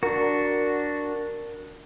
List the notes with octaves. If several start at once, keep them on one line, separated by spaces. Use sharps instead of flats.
D4 F#4 A#4